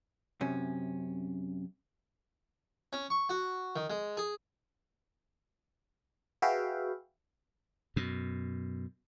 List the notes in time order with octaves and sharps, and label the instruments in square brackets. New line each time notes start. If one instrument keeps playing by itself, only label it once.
[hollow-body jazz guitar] F#2 C3 C#4
[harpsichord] C#4
C#6
F#4
D#3
G#3
G#4
[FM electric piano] F#4 G#4 B4 E5 F5 G5
[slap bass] F#2 B2